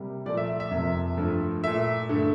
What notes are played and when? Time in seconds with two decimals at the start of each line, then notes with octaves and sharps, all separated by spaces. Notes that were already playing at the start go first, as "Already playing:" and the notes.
Already playing: C3 G3 A#3
0.25 A#2 F3 A3 D5
0.37 E5
0.60 E5
0.71 F2 C3 F3 A#3
1.17 G2 F3 A3
1.63 A#2 A3 E5
2.09 G2 D3 A3